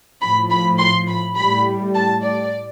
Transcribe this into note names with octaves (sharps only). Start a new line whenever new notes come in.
A2 F3 B5
B5
C6
B5
A2 G3 B5
A5
D5